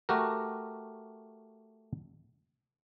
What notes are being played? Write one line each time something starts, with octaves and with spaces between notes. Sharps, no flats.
A3 F#4 G4 A#4